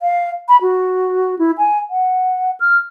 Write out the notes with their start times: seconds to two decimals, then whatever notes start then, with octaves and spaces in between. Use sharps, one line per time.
0.01 F5
0.49 B5
0.62 F#4
1.39 E4
1.58 G#5
1.90 F#5
2.60 F6